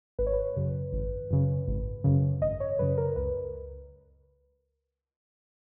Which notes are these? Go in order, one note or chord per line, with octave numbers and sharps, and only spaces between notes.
G#1 B4
C#5
B4
F#2 C#3
G#1
F#2 C#3
G#1
F#2 C#3
G#1 D#5
C#5
F#2 C#3 B4
A#4
C#2 B4